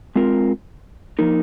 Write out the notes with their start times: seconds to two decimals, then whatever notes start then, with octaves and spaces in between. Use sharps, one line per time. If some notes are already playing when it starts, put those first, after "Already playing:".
0.15 G#3 C4 F4 A#4
1.19 F3 A#3 D#4 A#4